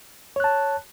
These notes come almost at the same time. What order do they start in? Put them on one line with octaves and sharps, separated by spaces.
C#5 F#6 A5